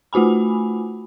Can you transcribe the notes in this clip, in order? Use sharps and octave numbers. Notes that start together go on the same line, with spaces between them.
A3 F4 F#4 G#5 B5